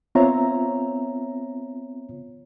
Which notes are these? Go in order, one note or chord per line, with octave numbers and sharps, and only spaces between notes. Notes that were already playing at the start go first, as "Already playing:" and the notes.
B3 C4 F4 C#5 E5 A#5